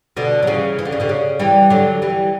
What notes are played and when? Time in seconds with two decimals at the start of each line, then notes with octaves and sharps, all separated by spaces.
0.17 B2 D3
0.43 F#3
0.47 C#3 E3
0.79 E3
0.85 D3
0.92 C#3
1.00 B2 D3
1.09 C#3
1.39 E3 G3
1.70 D3 F#3
2.02 E3 G3